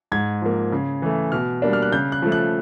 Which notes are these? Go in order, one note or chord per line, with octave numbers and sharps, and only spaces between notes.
G#2 G#6
F3 A#3
C#3
E3 A3
B2 F6
G3 A#3 D4
F6
F#6
C#3 G6
F#6
F3 A3
F#6